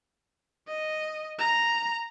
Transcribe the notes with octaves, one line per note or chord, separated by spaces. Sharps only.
D#5
A#5